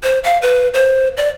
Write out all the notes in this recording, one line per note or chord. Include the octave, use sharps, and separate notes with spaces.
C5
F5
B4
C5
D5